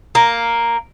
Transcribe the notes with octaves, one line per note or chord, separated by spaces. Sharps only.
A#3